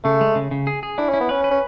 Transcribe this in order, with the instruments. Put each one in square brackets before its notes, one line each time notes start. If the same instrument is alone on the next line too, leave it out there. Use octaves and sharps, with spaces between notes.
[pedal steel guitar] C#3 [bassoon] A3
[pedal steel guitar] G#3
C#3
C#3
G#4
G#4
[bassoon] D4 [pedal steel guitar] E4
[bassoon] C#4 [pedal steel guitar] E4
[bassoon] B3
[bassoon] C#4 [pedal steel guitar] B4
[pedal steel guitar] B4
[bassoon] C#4